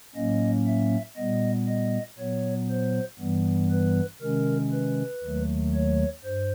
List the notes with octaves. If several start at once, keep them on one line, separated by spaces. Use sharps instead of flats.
A2 F#3 A#3 C#4 D#5
E5
A#2 G3 B3 D#5
D#5
A#2 F#3 B3 C#5
C5
G2 E3 G3 B3
B4
C3 D#3 G#3 C#4 A#4
B4
D#2 D#3 F#3 A3
C#5
G2 C5